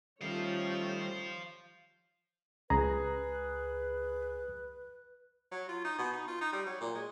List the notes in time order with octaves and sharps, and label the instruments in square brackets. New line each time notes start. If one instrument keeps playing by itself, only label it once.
[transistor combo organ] D#3 G3 [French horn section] A3 C#4 [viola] F4 C#5 [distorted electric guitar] C5 F5
[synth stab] C#2 [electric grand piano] G#4 [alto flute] B4 [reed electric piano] A#5
[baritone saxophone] F#3
F4
D#4
B2
D#4
F4
D#4
G3
F#3
A#2
G#3